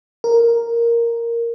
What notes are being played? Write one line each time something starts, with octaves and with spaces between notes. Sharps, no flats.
A#4